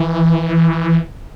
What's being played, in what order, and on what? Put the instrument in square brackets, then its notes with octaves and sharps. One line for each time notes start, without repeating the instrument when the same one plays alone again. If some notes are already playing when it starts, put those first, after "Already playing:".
Already playing: [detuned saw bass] E3